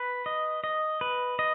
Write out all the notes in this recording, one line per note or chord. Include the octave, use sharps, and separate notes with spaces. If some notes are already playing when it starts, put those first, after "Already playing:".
Already playing: B4
D#5
D#5
B4
D#5